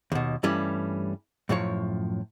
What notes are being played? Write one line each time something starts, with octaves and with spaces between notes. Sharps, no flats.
D#2 B2
G2 E3 G3 A3 C#4
F#2 A2 F3 C#5